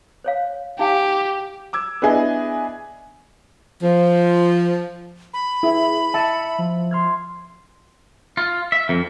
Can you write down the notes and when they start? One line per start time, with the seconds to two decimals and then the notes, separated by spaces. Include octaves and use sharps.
0.24 C5 C#5 F5
0.79 D#4 G4 F5 G#5
1.73 D6 E6 G#6
2.02 B3 D4 E4 G#4 D#5
3.83 F3
5.34 B5
5.63 E4 G#4
6.14 E5 A5 C#7 D#7
6.58 F3
6.91 C6 F6 G#6
8.37 F4
8.72 E5
8.89 F2